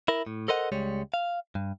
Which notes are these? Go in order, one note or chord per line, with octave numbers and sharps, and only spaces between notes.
E4 A#4
A2
A4 A#4 C5 D#5 F#5
C#2 G3 G#3 C#5
F5
G2